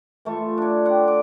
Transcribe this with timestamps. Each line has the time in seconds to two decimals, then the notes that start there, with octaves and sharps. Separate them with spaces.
0.25 E3 A3 F4 C#6
0.58 D4 C#5
0.85 D5 F#5 G5 C6
1.05 D5 D6